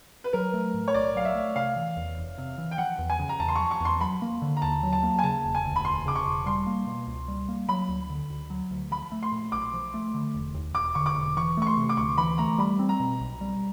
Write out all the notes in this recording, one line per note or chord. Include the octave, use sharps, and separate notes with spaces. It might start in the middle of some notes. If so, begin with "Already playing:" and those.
B4
F#3 A#4
A3
A2
C#5
B1 D5
F#3 F5
E5
A3
C3 F5
E3
E2
F1
C3
E3
G5
F3 F#5
E2
G#5
C#3
A#5
E2 A5
C6
C#6
F3
C#6
E2 C6
F#3 B5
A#3
D3
A#5
D#2 A5
F#3
A5
A#3
G#5
C#3 A5
E1
G#5
D2
B5
E1 C6
C#3 D6
C#6
E1
G3 C6
A#3
B2
C#2
G3
A#3
F#3 B5
D2
D3
D2
F#3
D2
F3 B5
A3
C6
A#2
B1 D6
F3
A3
D3
E1
D#2
E1 D6
D3 C#6
D6
E1
E3 C#6
A3 C#6
C6
C3
D6
D2 C#6
E3 B5
A3 A#5
G3 B5
C4
A#5
B2
B1
G3